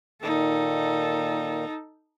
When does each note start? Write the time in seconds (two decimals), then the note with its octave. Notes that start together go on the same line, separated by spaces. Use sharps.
0.22 A#2 D#3 A#3 D#4 A4